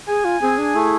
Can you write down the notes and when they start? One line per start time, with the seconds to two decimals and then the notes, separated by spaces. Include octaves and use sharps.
0.07 G#4 G#5
0.25 F4
0.42 C4 G#4
0.58 D4
0.75 A3 E4